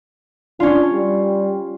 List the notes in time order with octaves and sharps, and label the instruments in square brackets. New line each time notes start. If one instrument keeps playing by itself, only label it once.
[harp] C#4 F4 [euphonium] D4
[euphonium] G3